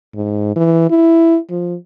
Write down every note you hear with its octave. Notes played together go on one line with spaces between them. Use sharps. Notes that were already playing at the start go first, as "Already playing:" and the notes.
G#2
E3
E4
F3